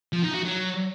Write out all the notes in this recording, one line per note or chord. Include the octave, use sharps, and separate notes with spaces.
F3
D#4
F#4
F#3